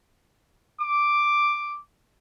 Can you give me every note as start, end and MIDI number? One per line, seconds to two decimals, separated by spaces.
0.80 1.78 86